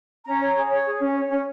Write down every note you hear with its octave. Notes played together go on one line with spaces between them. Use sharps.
C#4 A#5
C#5
G#4
C#5
G#4
C#4
C#5
C#4